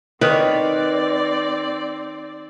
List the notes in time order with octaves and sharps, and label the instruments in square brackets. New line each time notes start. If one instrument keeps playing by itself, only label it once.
[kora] D#3 [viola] C4 D5 [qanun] B4 C#5